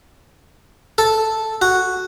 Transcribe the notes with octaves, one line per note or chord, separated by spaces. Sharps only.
A4
F#4